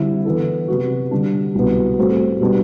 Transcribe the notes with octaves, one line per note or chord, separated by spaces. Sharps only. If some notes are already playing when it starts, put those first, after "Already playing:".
Already playing: D3 G3 C4 E4
E3 B3 E4 A4
C3 F#3 B3 F#4
D3 G3 D4
C2 B2 F#3 B3
A2 G3 C4 F#4 A4
B2 G3 B3 D4